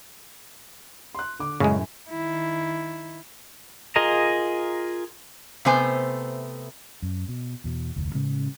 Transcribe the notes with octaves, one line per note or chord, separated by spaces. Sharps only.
C6 F#6
D3 D6
F#2 A2 C#3 G#3 G#5
D#3 E4
F4 G#4 A#4 D#5 A#5
C3 A3 B3 C5 G#5
F#2
B2
E2 B2
F1 D2
A2 C#3 G#3 C#4